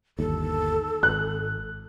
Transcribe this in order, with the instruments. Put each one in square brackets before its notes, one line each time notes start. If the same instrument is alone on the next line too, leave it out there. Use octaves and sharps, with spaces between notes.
[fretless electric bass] G1 D#2 [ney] A4
[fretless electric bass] D#1 G#1 [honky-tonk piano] F#6